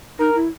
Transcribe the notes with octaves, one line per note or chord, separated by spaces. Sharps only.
D#4 A#4
E4